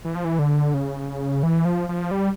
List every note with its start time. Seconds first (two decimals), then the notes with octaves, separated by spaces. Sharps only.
0.05 E3
0.15 F3
0.25 E3
0.39 D3
0.74 C#3
1.43 E3
1.65 F3
1.89 F3
2.11 G3